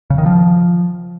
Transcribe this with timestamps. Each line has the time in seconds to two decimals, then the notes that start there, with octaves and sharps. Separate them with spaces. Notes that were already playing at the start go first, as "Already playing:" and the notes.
0.10 C#3
0.18 D#3
0.26 F3